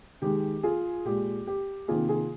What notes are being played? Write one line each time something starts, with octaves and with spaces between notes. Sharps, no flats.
D#3 G#3 G4
F4 G#4
A#2 G#3 G4
G4
C3 D#3 A#3 F4 G#4
F4 G#4